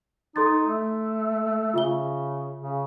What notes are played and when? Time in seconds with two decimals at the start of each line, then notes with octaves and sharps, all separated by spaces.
0.36 D#4 A4 C6 A6
0.67 A3
1.74 C#3 F4 E5 G7
2.62 C#3